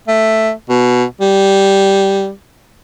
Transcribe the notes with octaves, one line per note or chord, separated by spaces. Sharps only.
A3
B2
G3